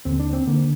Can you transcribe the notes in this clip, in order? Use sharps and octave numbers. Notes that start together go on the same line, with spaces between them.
D#2 D3 C4
D4
C4
D3 A#3